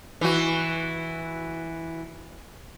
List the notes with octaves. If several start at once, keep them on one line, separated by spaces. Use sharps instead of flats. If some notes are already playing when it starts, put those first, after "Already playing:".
E3 F#4